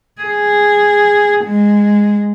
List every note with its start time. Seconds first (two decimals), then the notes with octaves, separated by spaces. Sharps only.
0.21 G#4
1.44 G#3